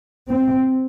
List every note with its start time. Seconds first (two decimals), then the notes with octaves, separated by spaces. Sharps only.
0.30 C4